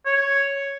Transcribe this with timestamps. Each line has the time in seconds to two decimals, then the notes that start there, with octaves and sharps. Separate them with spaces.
0.06 C#5